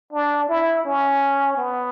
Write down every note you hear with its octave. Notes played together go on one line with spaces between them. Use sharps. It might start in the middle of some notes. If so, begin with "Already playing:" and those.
D4
E4
C#4
B3